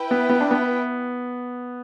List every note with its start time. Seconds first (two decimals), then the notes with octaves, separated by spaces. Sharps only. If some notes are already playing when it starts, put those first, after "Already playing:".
Already playing: E4 B4 G5
0.11 B3
0.29 B3
0.41 D4
0.51 B3